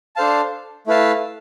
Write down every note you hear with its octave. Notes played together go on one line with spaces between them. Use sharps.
D4 A4 C5 F5 A5
A3 E4 B4 F5 A5